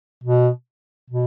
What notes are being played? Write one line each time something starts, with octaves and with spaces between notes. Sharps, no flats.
B2
B2